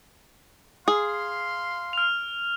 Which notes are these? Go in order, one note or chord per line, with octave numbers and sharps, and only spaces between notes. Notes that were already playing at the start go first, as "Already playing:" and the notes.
G#4 F5 C6
F6 F7